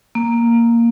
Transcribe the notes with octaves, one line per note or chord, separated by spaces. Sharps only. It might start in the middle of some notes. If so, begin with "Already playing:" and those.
A#3